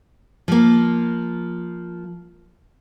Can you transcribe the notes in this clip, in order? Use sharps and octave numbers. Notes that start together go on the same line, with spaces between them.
F3 A#3